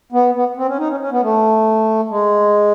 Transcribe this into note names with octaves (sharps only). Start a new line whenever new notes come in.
B3
B3
C4
C#4
D#4
C#4
C#4
B3
A3
G#3